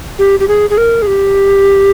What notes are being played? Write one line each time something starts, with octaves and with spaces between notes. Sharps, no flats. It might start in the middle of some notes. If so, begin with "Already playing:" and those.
G4
G4
G#4
G#4
A#4
G#4
G4